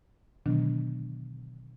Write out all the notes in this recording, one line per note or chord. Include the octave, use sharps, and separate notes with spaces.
B2 D3 D#3 F#3 B3 D4